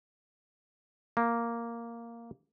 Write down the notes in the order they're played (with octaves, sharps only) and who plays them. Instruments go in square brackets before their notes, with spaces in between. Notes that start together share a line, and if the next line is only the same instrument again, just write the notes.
[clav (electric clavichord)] A#3